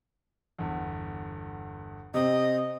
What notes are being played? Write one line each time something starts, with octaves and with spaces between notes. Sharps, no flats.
G1 E2
C3 C4 D#5